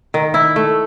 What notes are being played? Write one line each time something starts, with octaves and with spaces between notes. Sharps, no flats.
D#3
E4
A3